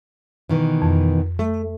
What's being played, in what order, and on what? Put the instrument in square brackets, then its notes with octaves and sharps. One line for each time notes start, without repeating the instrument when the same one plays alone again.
[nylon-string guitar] B2 D#3 E3
[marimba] F2
[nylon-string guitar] A3